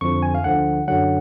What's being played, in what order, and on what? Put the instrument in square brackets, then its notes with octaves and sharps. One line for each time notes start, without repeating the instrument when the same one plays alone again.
[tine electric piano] F2 D3 F3 C#6
G#5
F5
D2 D3 F3 F#5
F#2 D3 F#3 F#5